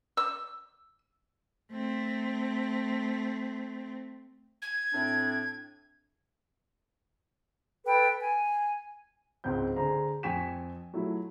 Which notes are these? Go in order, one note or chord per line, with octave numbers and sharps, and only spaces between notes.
E6
A3 C4
G#6
A2 C4 D4
A4 B4 G5
G#5
C#2 G#2 C4 G6
D3 G#4 C5 A#5
F2 G5 G#5 C#6 B6 E7
F#3 A3 E4 F4